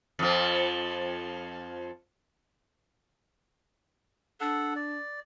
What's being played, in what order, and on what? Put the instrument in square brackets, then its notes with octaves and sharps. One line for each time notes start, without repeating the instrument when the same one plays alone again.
[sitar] F2 F3
[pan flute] D4 [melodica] A4 F#5
[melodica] D5